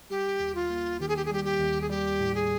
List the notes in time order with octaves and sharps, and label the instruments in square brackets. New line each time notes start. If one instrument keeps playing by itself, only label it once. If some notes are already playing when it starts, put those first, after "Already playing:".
[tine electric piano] G3 [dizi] G4
[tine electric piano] D#2
[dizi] F4
[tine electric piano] A#3
[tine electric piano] D#3 [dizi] G4
[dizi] G#4
G4
G#4
[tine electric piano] G3 [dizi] G4
[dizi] G4
[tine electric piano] D#2
[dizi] G#4
[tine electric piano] G3 [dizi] G4
[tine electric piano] A2
[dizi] G#4